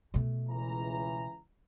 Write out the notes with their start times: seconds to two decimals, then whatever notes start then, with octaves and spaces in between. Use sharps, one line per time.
0.14 B2 A3
0.49 C#2 E3 A#5